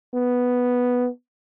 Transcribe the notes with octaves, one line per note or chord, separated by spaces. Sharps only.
B3